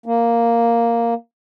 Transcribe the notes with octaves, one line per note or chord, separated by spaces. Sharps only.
A#3